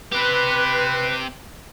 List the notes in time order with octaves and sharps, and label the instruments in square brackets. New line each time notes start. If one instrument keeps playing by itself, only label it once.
[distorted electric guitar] C4 G4 [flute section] B4